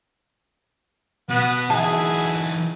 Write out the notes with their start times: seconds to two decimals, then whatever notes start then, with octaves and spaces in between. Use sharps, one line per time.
1.30 B2 B3 F#4
1.70 E3 D#4 E4 F#4 G#4 A5